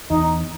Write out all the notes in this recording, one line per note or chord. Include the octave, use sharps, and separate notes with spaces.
E2 D#4